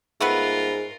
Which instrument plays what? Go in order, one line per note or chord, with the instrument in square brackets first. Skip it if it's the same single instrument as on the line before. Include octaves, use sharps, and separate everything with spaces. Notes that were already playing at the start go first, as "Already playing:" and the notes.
[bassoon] G#2 [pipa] A3 B3 B4 [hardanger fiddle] F4 A#4